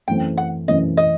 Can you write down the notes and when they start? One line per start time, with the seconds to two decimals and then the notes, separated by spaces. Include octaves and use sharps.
0.08 F#2 E3 A3 C4 G5
0.38 F#5
0.68 F#2 E3 A3 C4 D#5
0.97 D#5